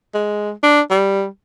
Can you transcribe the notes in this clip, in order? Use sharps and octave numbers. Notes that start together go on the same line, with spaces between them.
G#3
D4
G3